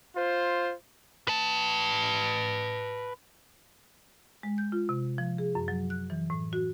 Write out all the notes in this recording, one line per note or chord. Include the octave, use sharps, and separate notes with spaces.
F4 C5
B4 A5
G#3
G6
F4
C3
F3
G#4
F#2
F#3
F#6
E3
A2
F#4